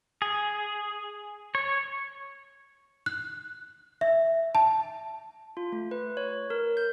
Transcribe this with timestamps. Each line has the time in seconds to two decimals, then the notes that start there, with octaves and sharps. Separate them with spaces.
0.22 G#4
1.55 C#5
3.06 F#6
4.01 E5
4.55 A5
5.57 F4
5.72 A3
5.91 B4
6.17 C#5
6.50 A#4
6.77 G6